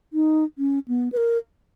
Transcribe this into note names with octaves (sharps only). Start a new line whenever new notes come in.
D#4
C#4
B3
B4
A#4